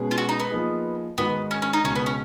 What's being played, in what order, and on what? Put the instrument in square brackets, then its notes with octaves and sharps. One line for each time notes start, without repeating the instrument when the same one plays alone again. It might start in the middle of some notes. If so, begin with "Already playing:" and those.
Already playing: [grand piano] B2 G#3 C#4 G#4 B4
[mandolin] F4
F#4
D#4
B3
[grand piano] F3 A#3 D#4 G#4
[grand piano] G#2 D#3 G#3 D#4 F#4 [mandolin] B3
[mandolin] C#4
C#4
D#4
[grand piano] C#2 B2 G#3 [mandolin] C#4
[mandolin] B3
C#4